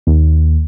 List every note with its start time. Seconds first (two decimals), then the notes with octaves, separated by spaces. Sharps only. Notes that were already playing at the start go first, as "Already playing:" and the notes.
0.07 D#2